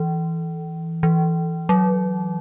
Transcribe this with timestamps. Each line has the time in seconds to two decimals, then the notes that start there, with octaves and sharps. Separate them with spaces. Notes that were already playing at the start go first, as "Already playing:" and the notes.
Already playing: E3
1.03 E3
1.69 F#3